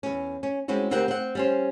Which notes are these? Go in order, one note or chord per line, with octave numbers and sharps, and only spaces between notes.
E2 C#4
C#4
G#3 C4 C#4 E4 F#4
D2 C4 G4 A#4 F#5
C4 F#5
G3 C#4 C5